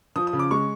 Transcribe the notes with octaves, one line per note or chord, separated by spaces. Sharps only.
F3 D#6
D#6
C#3
D6
G#3 C#6